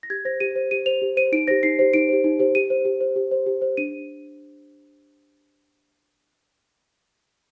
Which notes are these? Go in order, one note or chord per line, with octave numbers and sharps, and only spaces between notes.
A#6
G4 G#6
C5 A#6
G4 D#7
C5
G4 D#7
C5 F7
G4
C5 D#7
D#4 D7
G4 C5 A#6
D#4 C7
G4 C5
D#4 D7
G4 C5
D#4
G4 C5
G4 D#7
C5
G4
C5
G4
C5
G4
C5
D4 D#7